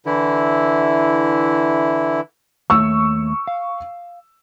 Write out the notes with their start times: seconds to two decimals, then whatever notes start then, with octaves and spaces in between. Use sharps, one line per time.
0.06 D3 E3 E4
2.70 D#2 A3 C#5 C#6 E6
3.47 F5